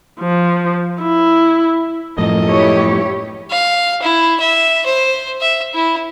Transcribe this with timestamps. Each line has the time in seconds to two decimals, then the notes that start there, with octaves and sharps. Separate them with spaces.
0.20 F3
1.02 E4
2.18 F#2 A2 F3 A4 A#4 D#5
2.48 E4 G4 C#5
3.50 F5
4.02 E4
4.40 E5
4.86 C5
5.41 E5
5.74 E4